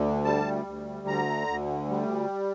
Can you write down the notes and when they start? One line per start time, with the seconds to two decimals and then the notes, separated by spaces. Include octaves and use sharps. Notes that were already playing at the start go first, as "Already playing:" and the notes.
Already playing: D2 D3
0.25 G3 A5
0.66 D2
1.07 D3 A#5
1.48 D2
1.89 G3